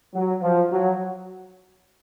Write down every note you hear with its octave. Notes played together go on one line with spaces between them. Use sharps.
F#3
F3
F#3